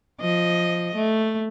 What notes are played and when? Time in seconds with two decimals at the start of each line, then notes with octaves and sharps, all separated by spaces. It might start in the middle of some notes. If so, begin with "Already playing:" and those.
0.21 F3 D#5
0.95 A3